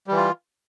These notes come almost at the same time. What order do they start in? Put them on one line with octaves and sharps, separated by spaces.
G3 E3 F4